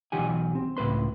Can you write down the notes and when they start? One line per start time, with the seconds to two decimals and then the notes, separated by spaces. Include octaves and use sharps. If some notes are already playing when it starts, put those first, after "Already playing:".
0.12 B1 E3 G4 F#5 G#5
0.55 C4
0.77 C#2 A2 B4 C6